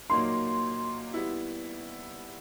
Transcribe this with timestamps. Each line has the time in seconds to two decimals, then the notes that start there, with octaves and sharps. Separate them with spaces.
0.10 A#2 F#3 A#3 D#4 C6
1.14 G3 B3 E4